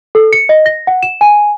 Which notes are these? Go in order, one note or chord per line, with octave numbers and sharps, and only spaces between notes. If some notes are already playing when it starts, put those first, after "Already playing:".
A4
C#7
D#5
A#6
F#5
E7
G#5